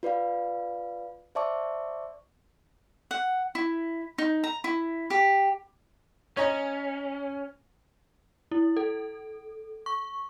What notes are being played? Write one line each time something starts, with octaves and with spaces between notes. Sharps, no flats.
F4 B4 D5 F5
C5 D5 E5 A5 C#6 D6
F#5
E4
D#4
A#5
E4
G4
C#4 C#5 D#5 A#5
E4
A4
C#6